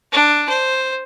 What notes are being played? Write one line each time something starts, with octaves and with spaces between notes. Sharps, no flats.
D4
C5